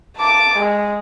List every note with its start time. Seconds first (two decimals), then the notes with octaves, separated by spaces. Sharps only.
0.17 A5 D6
0.56 G#3